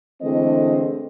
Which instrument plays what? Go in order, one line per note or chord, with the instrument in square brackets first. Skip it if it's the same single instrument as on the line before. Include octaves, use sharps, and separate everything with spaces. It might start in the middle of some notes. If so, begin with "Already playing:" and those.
[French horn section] D3 E3 G#3 A3 C4 D#5